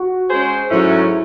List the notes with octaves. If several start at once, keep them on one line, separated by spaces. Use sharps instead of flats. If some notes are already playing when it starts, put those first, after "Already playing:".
Already playing: F#4
G#3 C#4 G#4 C5
G#2 F#3 A3 C#4 E4